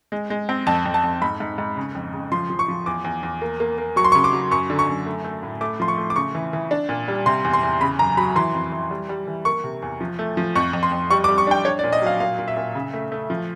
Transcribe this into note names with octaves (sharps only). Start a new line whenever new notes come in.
G#3
G#3
C4
F2 A5
F2
A5
F2
G#2 B5
G#2
G#2
C#3
F2
C#3
F3 C6
F3
C#6
F3
E2 D6
E2
E2
A#3
A#3
A#3
F#3 C#6
C6
C#6
C#3
D6
F#3
F#2 C#6
D3
C#6
F#2
A3
A3
A2
A3 D6
F3 C6
C#6
A3
D6
C#3 C#6
E3
E3
D4
A#2
G3
C3 C6
E2
C6
E2
C#3 B5
F#2 A#5
F#3 B5
E3 C6
F2
E3
G3
G3
E3
A#3 C#6
C3
E2
F3
A3
F3
F2 C#6
F2
C6
F2
G3 C#6
D6
G3
C#6
D4 G5
D4 C#5
D5
A#2
D#5
F#3 F5
A#2 F5
A#2
E5
A#2
C#3
A3
A3
F3